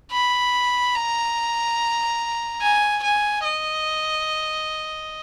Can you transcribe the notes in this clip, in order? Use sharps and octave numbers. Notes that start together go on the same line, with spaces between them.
B5
A#5
G#5
G#5
D#5